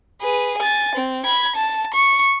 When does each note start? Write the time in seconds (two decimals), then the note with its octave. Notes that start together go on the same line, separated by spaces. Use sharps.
0.21 G#4 B4
0.58 G#5 A6
0.95 C4
1.25 B5 G#6
1.55 A5
1.94 C#6